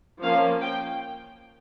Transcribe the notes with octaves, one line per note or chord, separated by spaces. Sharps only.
F3 A#3 C#4 F5
G5